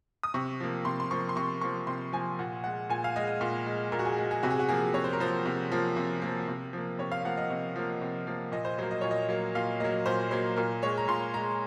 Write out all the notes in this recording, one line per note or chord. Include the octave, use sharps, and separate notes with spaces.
D#6
C3 C#6
F3 A#3
C3 C6
C6
F3 A#3 C#6
C6
C3 C#6
F3 A#3 C#6
C3 C6
F3 A#3 G#5
A#2 F#5
G#3 F#5
A#2 G#5
F5
G#3 D#5
A#2
G#3
A#2 A#4
F#4
G#4
G#3
G#4
C3 F#4
G#4
F#4
F3 A#3 G#4
C3 C#5
C5
A#4
F3 A#3 C5
C3
F3 A#3
C3
F3 A#3
C3
F3 A#3
C3 C#5
F5
F3 A#3 F#5
D#5
C3
F3 A#3
C3
F3 A#3
A#2 D#5
C5
F#3 A#3 C5
D#5
A#2 C#5
D#5
F#3 A#3
A#2 F5
F#3 A#3 D#5
A#2 C5
F#3 A#3 C5
A#2 A#4
G#3 C#5
A#5
A#2 C6
G#3 A#5